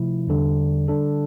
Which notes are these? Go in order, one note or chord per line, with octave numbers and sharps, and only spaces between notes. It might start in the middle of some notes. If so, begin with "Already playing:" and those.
Already playing: C3 F3 A3 E4
E2 D3 G3 D4
D3 G3 D4 A4